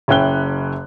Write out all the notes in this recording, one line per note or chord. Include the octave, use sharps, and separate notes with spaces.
F#1 C#4 E4 G5 F#6 G7